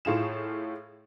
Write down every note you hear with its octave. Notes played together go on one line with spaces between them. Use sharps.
A2 F4 G#4 E7